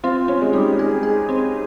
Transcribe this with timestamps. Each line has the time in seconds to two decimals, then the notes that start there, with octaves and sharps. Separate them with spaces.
0.04 C4 F4
0.28 C4 C#4
0.42 G#3
0.53 G3 D#4
0.79 G#3 G#4
1.03 G#4
1.29 C4